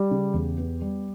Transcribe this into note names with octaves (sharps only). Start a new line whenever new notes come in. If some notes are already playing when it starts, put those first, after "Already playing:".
Already playing: G3 G4
C#3
E2
B3
G3